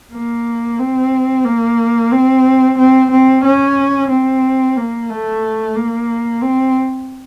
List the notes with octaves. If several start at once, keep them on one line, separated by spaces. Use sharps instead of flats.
A#3
C4
A#3
C4
C4
C4
C#4
C4
A#3
A3
A#3
C4